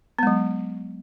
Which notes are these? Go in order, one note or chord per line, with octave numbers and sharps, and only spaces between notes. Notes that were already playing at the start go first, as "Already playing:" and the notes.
F#3 G#3 B3